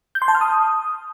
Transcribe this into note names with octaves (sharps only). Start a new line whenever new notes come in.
G6
C6
A5
F6
D#6